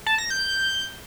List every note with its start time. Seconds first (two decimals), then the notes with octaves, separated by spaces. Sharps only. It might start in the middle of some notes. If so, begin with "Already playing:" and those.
0.06 A5
0.18 A#6
0.30 G6